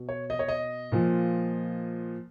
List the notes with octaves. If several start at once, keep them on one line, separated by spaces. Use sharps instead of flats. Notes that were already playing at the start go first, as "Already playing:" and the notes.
Already playing: B2
C#5
D#5
C#5
D#5
A#2 F3